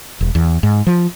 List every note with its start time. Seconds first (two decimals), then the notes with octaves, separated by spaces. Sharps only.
0.21 E1
0.35 E2
0.63 G#2
0.87 F3